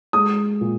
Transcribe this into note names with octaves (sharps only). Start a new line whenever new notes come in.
G#3 D#6
A#2